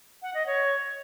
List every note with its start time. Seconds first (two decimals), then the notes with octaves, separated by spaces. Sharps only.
0.22 F#5
0.34 D#5
0.46 C#5